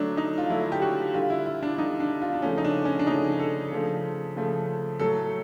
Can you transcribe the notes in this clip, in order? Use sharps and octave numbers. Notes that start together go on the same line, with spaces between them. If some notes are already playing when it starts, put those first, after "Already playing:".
Already playing: D3 F#3 A3 D4
D#4
F4
D3 F#3 A3 E4
G4
F#4
D3 G3 F4
E4
E4
D4
D3 G3 D#4
D4
F4
D4
C#3 F3 A3 C#4
D#4
D4
C#4
D4
C#3 F3 A3 D#4
A4
C#3 F3 A3
C#3 F3 A3
A2 F#3 A3 A4